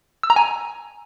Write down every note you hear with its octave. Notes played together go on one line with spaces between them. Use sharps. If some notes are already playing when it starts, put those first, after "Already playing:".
E6
A#5
G#5